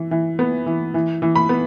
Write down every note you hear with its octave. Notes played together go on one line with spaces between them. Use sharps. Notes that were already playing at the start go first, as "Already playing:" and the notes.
Already playing: E3
E3
B3
E3
E3
E3
B5
B3